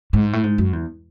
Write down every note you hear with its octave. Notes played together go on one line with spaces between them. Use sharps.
G#2
A2
G#2
F#2
E2